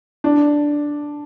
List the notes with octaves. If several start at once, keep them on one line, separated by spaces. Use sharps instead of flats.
D4